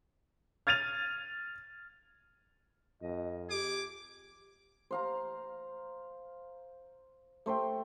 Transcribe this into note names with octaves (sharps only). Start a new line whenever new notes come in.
F6 G#6 A6 D#7 F7
F2 D#5
G4 G#4 D6
C5 F5 A#5
A3 C5 E5 G5